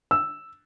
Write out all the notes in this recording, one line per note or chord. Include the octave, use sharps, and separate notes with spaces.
E6